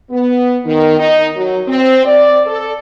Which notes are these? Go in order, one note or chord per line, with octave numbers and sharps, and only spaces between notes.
B3
D#3
D#4
F#3
C4
D5
A4